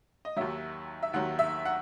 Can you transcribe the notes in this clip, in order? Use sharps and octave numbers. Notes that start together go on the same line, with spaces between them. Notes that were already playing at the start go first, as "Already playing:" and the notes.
D#5
D#2 D#3 F#3 E5
E5
D#2 D#3 F#3 F#5
E5
F#5